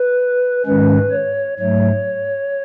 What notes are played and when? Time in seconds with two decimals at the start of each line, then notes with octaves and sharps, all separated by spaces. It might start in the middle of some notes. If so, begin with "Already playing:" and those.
Already playing: B4
0.66 G#2 D#3 G#3 C#4 B4
1.11 C#5
1.59 G#2 F#3 A3 C#5